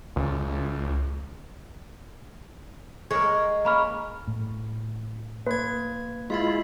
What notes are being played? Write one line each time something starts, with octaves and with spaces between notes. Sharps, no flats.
C#2
G#3 A#4 C#5
A#3 C#4 A#5 B5 F6
A2
A#3 B4 G#6
G#3 E4 F4 E5 F5 B5